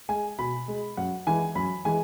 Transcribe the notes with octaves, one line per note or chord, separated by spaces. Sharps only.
G#3 G#5
B2 B5
G#3
F#2 F#5
E3 G#3 G#5
F#2 B5
E3 G#3 G#5